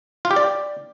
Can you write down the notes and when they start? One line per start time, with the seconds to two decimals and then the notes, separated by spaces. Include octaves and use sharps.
0.25 F4
0.31 G4
0.36 D5